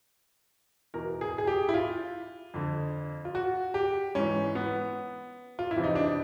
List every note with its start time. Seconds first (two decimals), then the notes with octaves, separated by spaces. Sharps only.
0.94 E2 B2 A#4
1.21 G#4
1.38 G#4
1.47 G4
1.69 E4
1.74 F4
2.54 F2 D3
3.25 F4
3.35 F#4
3.74 G4
4.15 G#2 E3 C#4
4.55 B3
5.59 F4
5.71 E4
5.76 F2 C3 E3
5.84 D#4
5.95 D4